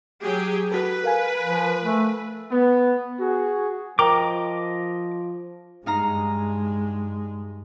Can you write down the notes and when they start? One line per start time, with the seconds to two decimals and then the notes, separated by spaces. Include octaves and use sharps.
0.22 F#3 G4 G#4
0.72 F#4 A4 B4
1.04 A#4 F5 G#5
1.42 F3
1.82 A3
2.51 B3
3.19 F#4 G#4
3.99 F3 A#4 D#5 G5 A#5 D6
5.86 G2 G#3 D#4 F5 A#5